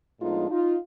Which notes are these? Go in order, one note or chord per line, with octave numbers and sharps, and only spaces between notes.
A2 F3 G#3 B3 D4 D#4 F4
D#4 F4